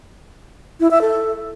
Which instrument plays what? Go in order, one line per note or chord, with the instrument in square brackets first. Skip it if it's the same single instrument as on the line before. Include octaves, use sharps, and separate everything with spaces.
[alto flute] E4
E5
A4